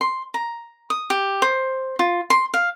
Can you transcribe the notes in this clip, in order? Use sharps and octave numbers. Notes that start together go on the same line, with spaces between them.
C6
A#5
D#6
G4
C5
F4
C6
F5